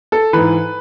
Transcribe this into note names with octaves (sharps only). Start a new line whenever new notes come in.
A4
G#2 E3 B4